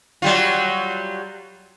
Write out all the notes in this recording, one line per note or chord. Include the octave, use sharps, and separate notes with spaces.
F#3 G3 F4